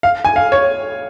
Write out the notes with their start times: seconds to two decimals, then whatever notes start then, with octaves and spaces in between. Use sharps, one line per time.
0.03 F5
0.25 G#5
0.36 F5
0.52 C#5